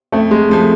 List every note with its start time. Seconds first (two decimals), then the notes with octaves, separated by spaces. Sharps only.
0.12 F2 A3
0.31 G#3
0.50 C3 F3 G#3 A3